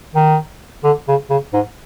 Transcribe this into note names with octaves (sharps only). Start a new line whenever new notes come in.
D#3
D3
C#3
C#3
G#2